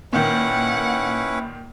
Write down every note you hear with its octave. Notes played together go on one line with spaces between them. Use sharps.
A#2 D#3 C#4 E4 B4 F#5